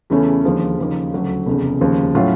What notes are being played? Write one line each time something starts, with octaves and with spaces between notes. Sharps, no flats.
E2 C#3 E3 A3 C#4
D#2 D3 F3 G#3
D#2 C#3 F3 A#3 D#4
D2 C#3 F#3 A3
F1 E2 C#3
D#2 C#3 F3
A2 F#3 A3 C#4 F4